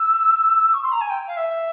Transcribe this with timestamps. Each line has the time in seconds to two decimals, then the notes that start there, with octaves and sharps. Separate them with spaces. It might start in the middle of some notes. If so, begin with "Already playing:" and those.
Already playing: E6
0.74 C#6
0.83 C6
0.92 A#5
1.01 G#5
1.10 G5
1.27 F5
1.37 E5